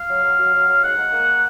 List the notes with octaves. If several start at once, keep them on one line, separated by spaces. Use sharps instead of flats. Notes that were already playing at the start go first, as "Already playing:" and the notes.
Already playing: F5
F#3
F#3
F#3
F#3
F#3
G#2 F#5
G#2
A#3